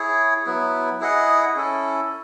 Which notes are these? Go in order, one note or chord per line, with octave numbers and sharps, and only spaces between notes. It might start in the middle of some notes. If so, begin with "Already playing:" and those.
Already playing: E4 G#4 C#5
F#3 B3 E4
E4 G#4 D#5 F#5
C#4 E4 A4